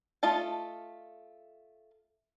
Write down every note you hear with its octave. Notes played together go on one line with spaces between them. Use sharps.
A3 F4 D#5 A5